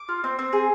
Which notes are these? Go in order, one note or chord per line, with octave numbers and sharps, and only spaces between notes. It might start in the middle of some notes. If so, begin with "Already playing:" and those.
Already playing: D6
F4
C4
C4
G#4